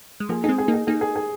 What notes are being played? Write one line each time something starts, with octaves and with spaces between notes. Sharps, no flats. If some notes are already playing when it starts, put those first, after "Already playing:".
G#3
F3 A#3 G#4
G#3 C4 D#4 G#4
G#4
A#3 D#4
G#4
A#3 D#4 G#4
G#4
G#4